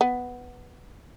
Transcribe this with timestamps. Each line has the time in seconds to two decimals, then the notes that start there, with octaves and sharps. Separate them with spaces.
0.01 B3